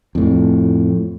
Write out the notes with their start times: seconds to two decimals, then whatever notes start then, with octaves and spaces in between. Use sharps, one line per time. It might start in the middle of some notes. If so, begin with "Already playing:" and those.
0.15 F2 A2